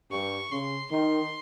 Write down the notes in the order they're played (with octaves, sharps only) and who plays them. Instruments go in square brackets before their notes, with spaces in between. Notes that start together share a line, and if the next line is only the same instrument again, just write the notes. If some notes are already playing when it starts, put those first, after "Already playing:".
[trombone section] G2 [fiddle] C#6
[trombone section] C#3 [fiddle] C6
[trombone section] D#3 [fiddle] C6